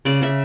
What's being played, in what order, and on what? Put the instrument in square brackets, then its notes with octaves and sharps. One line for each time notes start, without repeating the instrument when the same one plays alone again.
[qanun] C#3 D5
C#3 E5